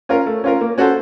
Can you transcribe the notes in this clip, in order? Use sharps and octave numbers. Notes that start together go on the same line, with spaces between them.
C#4 F4 A#4
A3
C#4 F4 A#4
A#3
C#4 F#4 A4 C5